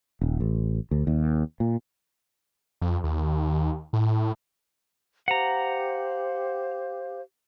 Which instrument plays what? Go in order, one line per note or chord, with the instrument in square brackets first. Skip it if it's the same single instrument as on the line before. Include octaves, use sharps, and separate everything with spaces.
[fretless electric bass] D#1
A1
D2
D#2
A#2
[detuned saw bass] F2
D#2
A2
[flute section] G4 C5 F5 [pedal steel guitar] F#5 A#5